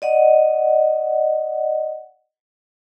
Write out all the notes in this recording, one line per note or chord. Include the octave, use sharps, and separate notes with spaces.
D5 D#5 F#5